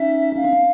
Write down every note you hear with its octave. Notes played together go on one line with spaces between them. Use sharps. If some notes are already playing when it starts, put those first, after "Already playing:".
Already playing: C#4 D#4 E5
C#4 D#4 F5
C4 D4